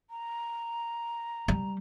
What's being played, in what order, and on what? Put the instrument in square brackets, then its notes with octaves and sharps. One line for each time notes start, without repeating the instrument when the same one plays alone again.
[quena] A#5
[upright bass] G3